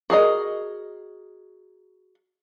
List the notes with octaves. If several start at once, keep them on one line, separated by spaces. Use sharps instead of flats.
F#4 G#4 A#4 D#5